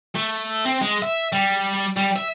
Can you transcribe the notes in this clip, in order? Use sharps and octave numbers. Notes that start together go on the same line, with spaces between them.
A3
C4
G#3
E5
G3
G3
E5